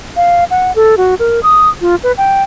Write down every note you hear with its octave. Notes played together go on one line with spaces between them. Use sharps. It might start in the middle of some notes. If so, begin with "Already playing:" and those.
F5
F#5
A4
F#4
A#4
D#6
F4
B4
G5